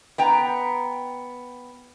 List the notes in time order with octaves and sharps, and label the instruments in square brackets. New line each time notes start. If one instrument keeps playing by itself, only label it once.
[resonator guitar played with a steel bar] B3 G5 A#5